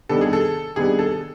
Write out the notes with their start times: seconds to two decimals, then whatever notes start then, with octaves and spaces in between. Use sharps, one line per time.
0.09 C3 D#3 G3 B3 D4 A4
0.21 G#4
0.33 A4
0.76 C3 D#3 G3 B3 D4 G#4
0.99 A4